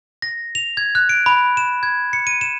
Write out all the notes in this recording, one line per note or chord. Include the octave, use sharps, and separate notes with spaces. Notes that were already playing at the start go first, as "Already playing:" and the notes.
A#6
F7
G#6
F#6
D7
B5
E7
G#6
C#7
D#7
E7